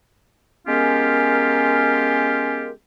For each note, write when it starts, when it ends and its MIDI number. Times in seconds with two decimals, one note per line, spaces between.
0.67 2.70 56
0.67 2.70 59
0.67 2.70 61
0.67 2.70 65
0.67 2.70 67
0.67 2.70 70